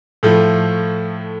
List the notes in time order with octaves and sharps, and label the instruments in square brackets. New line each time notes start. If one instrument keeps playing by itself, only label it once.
[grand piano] A2 F3 A3